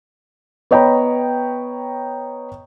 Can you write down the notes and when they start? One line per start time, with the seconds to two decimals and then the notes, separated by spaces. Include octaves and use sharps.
0.71 B3 C#5 D#5 G5 A#5 B5